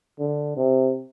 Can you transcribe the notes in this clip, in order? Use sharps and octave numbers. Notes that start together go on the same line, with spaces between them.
D3
C3